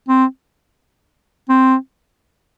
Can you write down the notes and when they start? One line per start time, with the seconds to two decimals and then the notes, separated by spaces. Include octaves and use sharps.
0.08 C4
1.49 C4